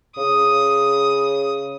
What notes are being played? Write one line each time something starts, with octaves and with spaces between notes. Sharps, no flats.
C#3 D#6